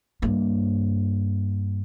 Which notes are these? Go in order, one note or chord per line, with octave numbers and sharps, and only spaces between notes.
G2 A#3